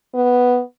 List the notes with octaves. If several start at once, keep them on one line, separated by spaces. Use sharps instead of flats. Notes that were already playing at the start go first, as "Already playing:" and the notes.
B3